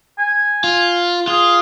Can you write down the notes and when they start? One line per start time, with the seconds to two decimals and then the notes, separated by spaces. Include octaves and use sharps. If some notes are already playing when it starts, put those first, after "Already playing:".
0.19 G#5
0.64 F4
1.28 F4 G#4